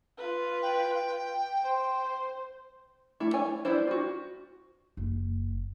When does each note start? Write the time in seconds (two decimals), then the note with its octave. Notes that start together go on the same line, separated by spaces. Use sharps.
0.18 F4 B4
0.62 G5
1.63 C5
3.20 A3 E4
3.34 C#5 G#5
3.65 B3 D4 E4 C5
3.87 F4 F#4
4.97 F#1